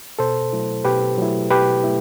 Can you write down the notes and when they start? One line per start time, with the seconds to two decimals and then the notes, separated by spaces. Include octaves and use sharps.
0.19 B2 A4 C5
0.53 F#3 A3 E4
0.85 B2 G4 B4
1.18 F#3 A3 E4
1.50 B2 G4 B4
1.84 A3 E4